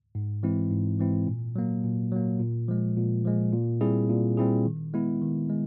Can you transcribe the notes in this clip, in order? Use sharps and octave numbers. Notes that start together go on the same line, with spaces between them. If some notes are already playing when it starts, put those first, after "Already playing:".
G#2
E3 G#3 C4 E4
G#2
E3 G#3 C4 E4
A#2
F#3 A#3
A#2
F#3 A#3
A#2
F3 G#3
A#2
F3 G#3
A#2
G3 C4 E4 G#4
A#2
G3 C4 E4 G#4
D#3
G#3 B3 E4
D#3
G#3